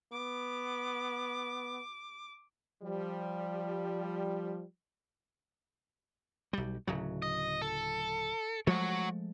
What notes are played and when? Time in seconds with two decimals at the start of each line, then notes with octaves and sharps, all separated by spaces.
0.12 B3 D6
2.82 F3 G3
6.53 B1 G3
6.87 D1 C#3 F#3
7.22 D#5
7.62 A4
8.67 F3 G#3 A3 F#4 C#5